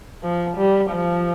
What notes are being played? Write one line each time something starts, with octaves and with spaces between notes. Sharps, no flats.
F3
G3
F3